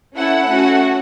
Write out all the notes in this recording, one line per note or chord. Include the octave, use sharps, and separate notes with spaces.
C#4 E4 A4 F#5
A3 C#4 F#4